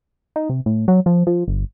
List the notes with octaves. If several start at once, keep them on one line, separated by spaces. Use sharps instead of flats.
D#4
C3
A2
F#3
F3
F3
G1